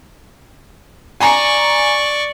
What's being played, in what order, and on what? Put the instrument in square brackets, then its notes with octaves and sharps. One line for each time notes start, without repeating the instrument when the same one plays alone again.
[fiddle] D5 C#6 [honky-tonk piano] G#5 A#5